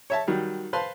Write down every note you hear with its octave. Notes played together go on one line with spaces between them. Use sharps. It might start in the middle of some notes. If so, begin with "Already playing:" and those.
C#5 E5 A5
D#3 F#3 G3
B4 C5 F5 A5 C6